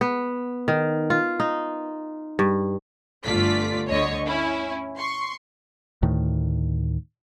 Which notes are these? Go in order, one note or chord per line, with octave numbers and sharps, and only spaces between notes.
B3
D#3
F4
D#4
G2
G1 D3 A3 F4 D5 B6
D2 D3 C#5 D#5 C#6
C#4 E4
C6 C#6
D2 A2 D#3